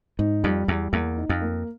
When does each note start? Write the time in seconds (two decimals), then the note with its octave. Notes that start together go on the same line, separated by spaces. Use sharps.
0.19 G#2 D#4
0.44 F2 G3
0.68 E2 G3
0.93 E2 A#3
1.17 D#4
1.29 F2
1.42 A#3